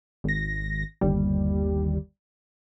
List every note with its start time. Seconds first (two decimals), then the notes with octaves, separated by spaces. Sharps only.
0.24 G#1 A#6
1.01 G1 D#2 G3